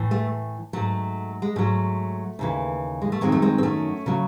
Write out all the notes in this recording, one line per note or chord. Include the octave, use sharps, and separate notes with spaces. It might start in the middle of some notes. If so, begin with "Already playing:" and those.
Already playing: A2 E3
A3
G#2 F#3 A3
G#3
G#2 F#3 A3
D#2 C#3 E3
G#3
A3
F#2 D#3 F#3 G#3 C4
A3
G#3 C4
C4
A3 C#4
C#3 F#3